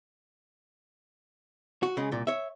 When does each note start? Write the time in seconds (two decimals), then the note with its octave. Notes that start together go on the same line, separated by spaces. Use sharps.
1.83 F#4
1.97 C#3 G#3
2.12 C2 A#2
2.27 C#5 E5